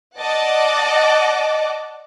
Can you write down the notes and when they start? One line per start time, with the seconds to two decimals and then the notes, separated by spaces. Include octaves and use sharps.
0.19 D5 D#5 F#5 A5 D6